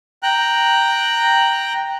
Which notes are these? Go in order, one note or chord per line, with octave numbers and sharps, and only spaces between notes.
G5 A#5 F#6